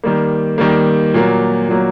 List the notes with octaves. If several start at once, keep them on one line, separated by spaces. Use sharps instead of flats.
D#3 G3 A#3
D#3 G3 A#3
A#2 F#3 A#3
A#2 F#3 A#3